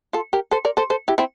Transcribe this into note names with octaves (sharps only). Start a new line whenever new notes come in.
F4 A4
G4 A#4
A4 C5
A#4 D5
A4 C5
A4 C5
E4 G4
C4 E4